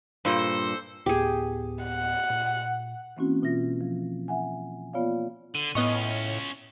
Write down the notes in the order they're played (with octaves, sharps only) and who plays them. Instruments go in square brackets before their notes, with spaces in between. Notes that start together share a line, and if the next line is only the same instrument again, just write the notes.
[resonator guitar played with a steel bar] G2 A#2 [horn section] A4 C5
[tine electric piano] D2 A2 B3 [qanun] G4 G#4
[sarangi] F#5
[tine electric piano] A#2
[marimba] E3 A#3 C4 C#4 E4 F#4
B2 F4 E5 A#6
F3
E5 F#5 G#5
A#3 B3 F4 C#5 D5 F5
[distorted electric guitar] D3 [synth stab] D#7
[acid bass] A2 [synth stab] B3 D#5 C#6 [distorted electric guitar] C#4 F4